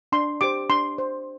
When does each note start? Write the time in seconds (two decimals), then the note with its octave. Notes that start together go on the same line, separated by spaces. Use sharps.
0.12 D4 C6
0.41 G4 C5 D6
0.69 D4 C6
0.98 C5